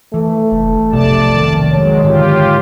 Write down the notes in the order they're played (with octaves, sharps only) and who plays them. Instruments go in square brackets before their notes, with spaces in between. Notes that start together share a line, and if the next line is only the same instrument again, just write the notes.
[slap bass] E3 [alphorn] A3
[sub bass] F1
[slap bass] F1 B1 [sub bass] C3 [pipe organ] D5 A5
[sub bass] D#3
[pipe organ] F#3 G#3 [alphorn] C#5
[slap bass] G#2 D3 F#3 [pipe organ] F4 G4